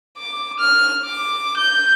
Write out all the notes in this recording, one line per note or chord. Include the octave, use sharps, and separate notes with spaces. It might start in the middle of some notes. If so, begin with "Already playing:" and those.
D6
F6
D6
G6